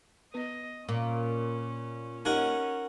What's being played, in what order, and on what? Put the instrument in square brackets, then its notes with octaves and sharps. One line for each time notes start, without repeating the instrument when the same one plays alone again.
[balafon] B3 B4 [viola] D#5
[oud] A#2 [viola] C#4
[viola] C#4 [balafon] D#4 G4 D#5 [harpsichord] A#4 F#5 G#5